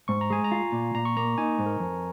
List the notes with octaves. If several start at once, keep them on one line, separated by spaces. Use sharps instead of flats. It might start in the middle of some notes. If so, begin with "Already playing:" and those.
G#2 C#6
A#5
G#3 G#5
A#5
F4
A#2
A#2 A#5
C#6
A#3 A#5
D#4 G#5
G#2
A#4
F2